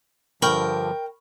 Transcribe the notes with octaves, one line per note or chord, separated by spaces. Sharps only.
G2 D3 F3 A#4 G5 B5 C#6 F6